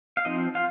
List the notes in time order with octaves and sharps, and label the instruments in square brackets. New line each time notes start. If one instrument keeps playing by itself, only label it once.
[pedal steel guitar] F5
F3 C4 D#4 D#5
F4 F5